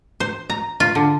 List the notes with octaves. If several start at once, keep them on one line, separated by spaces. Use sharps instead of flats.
C5
A#5
F4
D3